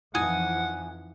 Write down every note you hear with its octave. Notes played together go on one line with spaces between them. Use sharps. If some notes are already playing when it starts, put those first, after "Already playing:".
F2 E3 F3 D#4 E4 F#5 G#5 D#6